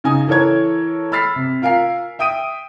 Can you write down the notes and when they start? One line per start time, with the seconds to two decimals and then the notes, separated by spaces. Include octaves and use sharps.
0.04 C#3 D#4 G#5 D#6
0.28 E3 A4 A#4 C#5 G#6
1.12 B5 E6 F6 A6 B6 C7
1.36 C3
1.62 F4 A#4 F5 G#5 C7
2.19 E5 G5 D#6 D7 D#7